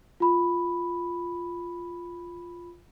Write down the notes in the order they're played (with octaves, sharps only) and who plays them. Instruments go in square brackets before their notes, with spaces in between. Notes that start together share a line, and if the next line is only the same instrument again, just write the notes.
[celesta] F4 B5